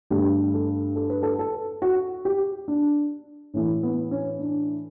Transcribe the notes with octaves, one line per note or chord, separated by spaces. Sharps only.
G2 D3 A3 G4
A4
A4
B4
A4
A4
F#4
G4
D4
A2 E3 A3 C#4
B3
C#4
D4